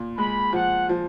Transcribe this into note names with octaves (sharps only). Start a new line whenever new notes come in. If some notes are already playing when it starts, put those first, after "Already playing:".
Already playing: A#2
G#3 B5
F3 F#5
F3